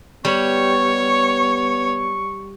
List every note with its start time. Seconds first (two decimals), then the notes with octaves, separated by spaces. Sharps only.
0.25 G3 B3 C#5 C#6